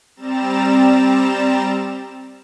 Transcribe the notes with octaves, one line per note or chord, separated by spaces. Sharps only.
G3 C4 A#5 A6 E7